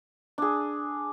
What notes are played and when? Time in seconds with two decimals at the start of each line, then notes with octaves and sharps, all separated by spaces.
0.38 D4 G#4